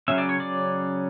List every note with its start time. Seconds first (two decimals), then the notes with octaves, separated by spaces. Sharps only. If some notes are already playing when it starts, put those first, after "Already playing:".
0.08 C#3 F#3 C#4 E5
0.18 D5
0.29 C#5
0.40 D5